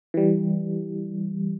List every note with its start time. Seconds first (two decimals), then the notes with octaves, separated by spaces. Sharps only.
0.14 E3 G3